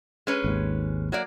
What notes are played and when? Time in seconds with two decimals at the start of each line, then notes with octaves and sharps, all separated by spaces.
0.27 G#3 C#4 B4
0.44 G#1 D#2
1.12 F#3 A#3 D5